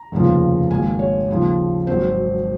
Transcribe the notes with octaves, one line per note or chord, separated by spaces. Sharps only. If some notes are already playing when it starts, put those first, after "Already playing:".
Already playing: A#5
F1 D#2 C#3 F3
G#1 G#2 D#3 A#3 G#5
C#5
D#2 C#3 F3
G#1 G#2 F#3 C4 C5